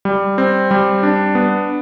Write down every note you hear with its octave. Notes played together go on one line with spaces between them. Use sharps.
G3
C4
G3
D4
B3